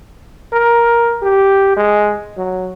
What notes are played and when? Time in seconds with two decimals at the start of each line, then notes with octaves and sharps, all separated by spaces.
0.53 A#4
1.22 G4
1.77 G#3
2.37 F#3